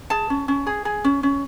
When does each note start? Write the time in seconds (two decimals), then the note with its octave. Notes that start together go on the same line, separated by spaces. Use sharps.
0.10 G#4 A5
0.30 C#4
0.48 C#4
0.66 G#4
0.85 G#4
1.04 C#4
1.23 C#4